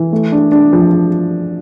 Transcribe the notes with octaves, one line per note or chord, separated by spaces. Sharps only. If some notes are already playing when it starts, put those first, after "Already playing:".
Already playing: E3
A3
D4
D4
F3